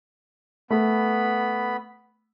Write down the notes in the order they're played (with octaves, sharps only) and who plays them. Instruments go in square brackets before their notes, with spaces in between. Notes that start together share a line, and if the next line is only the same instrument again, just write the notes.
[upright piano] A3 [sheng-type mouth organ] B3 B5